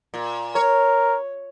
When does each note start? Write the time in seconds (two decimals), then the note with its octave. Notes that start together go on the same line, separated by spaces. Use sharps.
0.14 A#2
0.55 A#4 C#5